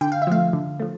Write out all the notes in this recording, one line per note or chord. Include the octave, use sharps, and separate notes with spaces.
D3 G5
F5
E5
F3 A3 F5
D3
F3 A3